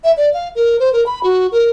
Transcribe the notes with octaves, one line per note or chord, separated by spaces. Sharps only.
E5
D5
F5
A#4
C5
A#4
B5
F#4
A#4